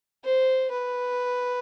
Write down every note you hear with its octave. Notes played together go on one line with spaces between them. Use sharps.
C5
B4